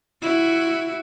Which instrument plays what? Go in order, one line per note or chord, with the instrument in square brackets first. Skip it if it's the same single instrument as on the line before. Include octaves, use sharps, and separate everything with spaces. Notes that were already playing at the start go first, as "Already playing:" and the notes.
[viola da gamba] E4 F#4